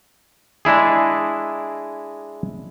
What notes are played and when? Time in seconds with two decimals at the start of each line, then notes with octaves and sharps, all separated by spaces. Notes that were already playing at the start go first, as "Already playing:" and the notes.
0.65 G#3 D4 E4 G#4